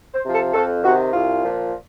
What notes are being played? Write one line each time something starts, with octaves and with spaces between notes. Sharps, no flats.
C5
C3 F3
A4
F2 A4
C3 D#3 F#4
C2 F4
A#2 F3